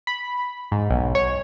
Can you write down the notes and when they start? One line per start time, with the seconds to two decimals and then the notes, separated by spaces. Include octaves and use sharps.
0.07 B5
0.72 G#2
0.90 B1
1.15 C#5